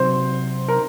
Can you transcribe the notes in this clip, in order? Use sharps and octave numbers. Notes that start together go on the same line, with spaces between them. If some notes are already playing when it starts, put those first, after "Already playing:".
Already playing: C3 F#3 C4 F#4 C5
A#4